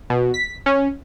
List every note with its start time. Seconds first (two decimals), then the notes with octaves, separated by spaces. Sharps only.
0.10 B2
0.34 B6
0.66 C#4